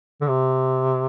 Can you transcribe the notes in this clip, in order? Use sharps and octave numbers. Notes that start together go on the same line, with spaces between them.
D3
C3